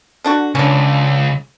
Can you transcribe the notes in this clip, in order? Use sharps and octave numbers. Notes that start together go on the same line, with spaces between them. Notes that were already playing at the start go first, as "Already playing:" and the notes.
D3 D4 F#4
C#2 C#4 D4